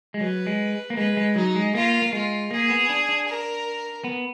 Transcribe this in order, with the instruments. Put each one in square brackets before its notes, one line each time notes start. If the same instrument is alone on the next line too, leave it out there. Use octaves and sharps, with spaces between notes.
[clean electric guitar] G#3
[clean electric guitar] F#3 [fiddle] B4
[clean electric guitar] G#3
A#3
[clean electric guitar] G#3 [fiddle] B4
[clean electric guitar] G#3
[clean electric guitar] F#3 [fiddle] D#4
[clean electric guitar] G#3
[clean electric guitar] A#3 [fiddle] F4
[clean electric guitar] A#3
[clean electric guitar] G#3 [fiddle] F4
[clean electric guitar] A#3 [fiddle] G#4
[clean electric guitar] B3
D4
D4
[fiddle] A#4
[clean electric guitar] B3